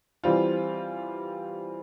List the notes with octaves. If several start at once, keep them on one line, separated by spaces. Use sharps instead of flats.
E3 G3 C4 F4